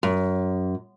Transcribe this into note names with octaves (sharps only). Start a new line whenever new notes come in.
F#2